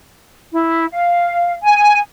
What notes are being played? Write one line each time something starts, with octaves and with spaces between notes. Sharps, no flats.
E4
F5
G#5